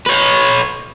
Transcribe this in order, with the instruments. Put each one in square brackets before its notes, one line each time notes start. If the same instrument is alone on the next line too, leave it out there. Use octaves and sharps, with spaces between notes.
[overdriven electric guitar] B4 C#5